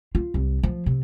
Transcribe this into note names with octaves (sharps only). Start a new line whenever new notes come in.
F4
C2
F3
C3